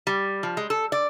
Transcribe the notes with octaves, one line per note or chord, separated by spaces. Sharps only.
G3
F3
G#3
A4
D5